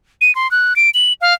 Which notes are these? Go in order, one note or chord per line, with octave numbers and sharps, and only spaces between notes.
D#7
C6
F#6
D7
F#7
F5